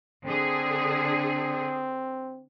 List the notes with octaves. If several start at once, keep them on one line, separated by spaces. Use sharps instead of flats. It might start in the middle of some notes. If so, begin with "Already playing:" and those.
D3 C4 G#4